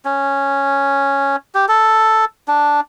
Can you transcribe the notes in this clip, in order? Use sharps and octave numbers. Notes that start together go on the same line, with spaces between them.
C#4
G4
A4
D4